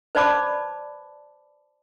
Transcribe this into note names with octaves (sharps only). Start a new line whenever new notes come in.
B4 C5 D5 A5 B5 D6